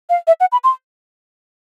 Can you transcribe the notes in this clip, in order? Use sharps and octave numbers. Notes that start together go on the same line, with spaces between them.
F5
E5
F#5
B5
C6